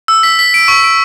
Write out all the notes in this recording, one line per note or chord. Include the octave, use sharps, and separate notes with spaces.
E6
B6
B6
D7
C#6
D7